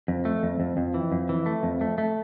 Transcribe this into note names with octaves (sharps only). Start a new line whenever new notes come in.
F2
A3
F2
F2
F2
E3
F2
E3
A3
F2
A3
A3